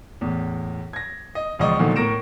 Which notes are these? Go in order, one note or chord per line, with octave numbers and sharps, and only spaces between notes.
E2 A2
G#6 A#6
D#5
E1 C#2 F3 D5 D#5 C#6
A#2 D3 D#3 F3 F#3 A3
A2 A#4 C#6 A#6 D7 E7